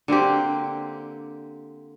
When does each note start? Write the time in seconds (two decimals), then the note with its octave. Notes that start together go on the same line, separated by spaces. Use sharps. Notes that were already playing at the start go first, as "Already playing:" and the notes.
0.08 D3 A#3 C4 G4